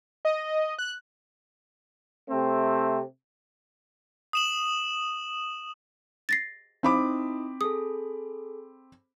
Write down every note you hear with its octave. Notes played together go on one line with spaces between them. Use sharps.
D#5
F#6
C3 A3 C4
D#6 E7 F#7
A6 A#6 C7
C4 D#4 E4 B5 D6 D#6
G#4 A4 D#6